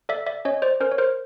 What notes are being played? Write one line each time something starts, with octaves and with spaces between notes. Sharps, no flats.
A4 D5 E5
D5 E5
C#4 C#5 D#5
C5 D5
C#4 A#4 C5
C#5
A#4 C5